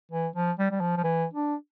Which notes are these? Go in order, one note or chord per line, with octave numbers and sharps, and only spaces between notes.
E3
F3
G3
G3
F3
F3
E3
D4